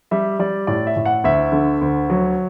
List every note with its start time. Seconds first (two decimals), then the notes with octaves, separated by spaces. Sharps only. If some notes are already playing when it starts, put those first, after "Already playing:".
0.11 G3 E5
0.39 G3 D5
0.67 A2 D5
0.87 E5
0.97 A2
1.05 F#5
1.24 D2 E5
1.52 D3
1.81 D2
2.10 F#3